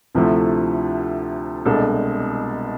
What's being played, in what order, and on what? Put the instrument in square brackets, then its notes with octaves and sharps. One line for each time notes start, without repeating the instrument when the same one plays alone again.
[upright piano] D2 C3 F3 A3 E4
C2 B2 G#3 D4 A4